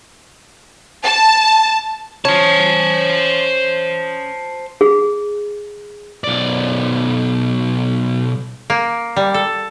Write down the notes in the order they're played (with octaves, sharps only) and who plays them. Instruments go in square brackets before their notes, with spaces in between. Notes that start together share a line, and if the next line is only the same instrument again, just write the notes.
[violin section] A5
[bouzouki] C#4 [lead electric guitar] C5 A5
[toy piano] G#4
[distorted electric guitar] B1 D5
[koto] A#3
G3
A4